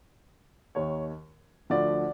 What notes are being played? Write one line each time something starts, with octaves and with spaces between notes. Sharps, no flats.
D#2 D#3 C#5
D2 D3 F3 D5